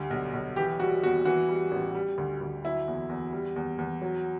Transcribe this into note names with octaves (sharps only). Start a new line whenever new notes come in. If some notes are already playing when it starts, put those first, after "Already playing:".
Already playing: D2 G3
B1
B1
E3 G4
G3 F#4
E2 F#4
E3 F#4
G3
A1
G3
D2
D2
F#3 E4
E2
E2
G3
E2
E2
F#3